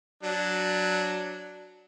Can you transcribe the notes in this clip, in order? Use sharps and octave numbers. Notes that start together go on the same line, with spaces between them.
F#3 D4